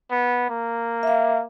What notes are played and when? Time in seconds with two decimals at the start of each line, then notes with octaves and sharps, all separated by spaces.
0.11 B3
0.50 A#3
1.03 E5 F5